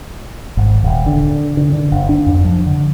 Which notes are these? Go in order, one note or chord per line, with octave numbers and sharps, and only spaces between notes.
G#1
D#1
D3
D3
D3
F#1
D4
F2
F3
D3